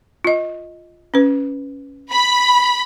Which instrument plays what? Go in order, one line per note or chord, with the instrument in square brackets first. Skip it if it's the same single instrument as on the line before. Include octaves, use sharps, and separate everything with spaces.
[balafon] F4 D#5
C#4 B4
[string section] B5